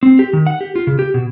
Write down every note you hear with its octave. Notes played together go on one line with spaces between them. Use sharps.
C4
G4
D#3
F#5
G4
F4
C#3
G4
B2